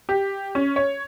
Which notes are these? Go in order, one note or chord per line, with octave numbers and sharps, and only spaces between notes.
G4
C#4
C#5